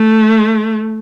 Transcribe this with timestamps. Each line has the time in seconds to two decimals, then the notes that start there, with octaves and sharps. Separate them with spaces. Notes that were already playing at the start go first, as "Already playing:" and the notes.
Already playing: A3